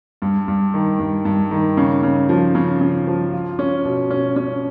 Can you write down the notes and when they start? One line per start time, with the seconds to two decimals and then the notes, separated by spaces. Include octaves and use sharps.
0.22 G2
0.48 G2
0.74 D#3
0.99 G2
1.25 G2
1.51 D#3
1.77 C#3
2.03 C#3
2.29 F3
2.55 C#3
2.81 C#3
3.07 F3
3.33 F4
3.59 C#4
3.85 B2
4.11 C#4
4.36 C#4